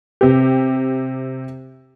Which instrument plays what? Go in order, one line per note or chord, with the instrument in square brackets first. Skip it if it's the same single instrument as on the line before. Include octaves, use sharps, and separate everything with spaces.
[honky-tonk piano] C3 G4